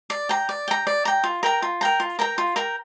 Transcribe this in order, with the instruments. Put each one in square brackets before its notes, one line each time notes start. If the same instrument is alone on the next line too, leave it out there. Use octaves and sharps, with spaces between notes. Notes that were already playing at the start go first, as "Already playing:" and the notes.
[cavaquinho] D5
G5 A#5
D5
G5 A#5
D5
G5 A#5
F4
A#4 G5 A#5
F4
A#4 G5 A#5
F4
A#4 G5 A#5
F4
A#4 G5 A#5